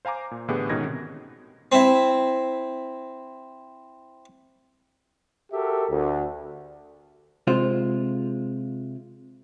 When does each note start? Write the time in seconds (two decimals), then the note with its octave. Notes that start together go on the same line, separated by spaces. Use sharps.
0.05 C5 F5 G#5 A#5 D6
0.31 A#2
0.48 A2 D3 E3 B3 G4 G#4
0.69 G#2 B2 D#3 C#4 G#6 A#6
0.86 C3
1.72 C4 E4
5.52 F#4 G4 A4 A#4 E5
5.90 D2
7.47 C3 G#3 F4 C5